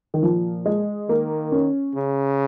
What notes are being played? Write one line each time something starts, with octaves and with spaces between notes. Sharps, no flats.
D#3
A#2 F3
G#3
D#3 A#3
C#4
C#3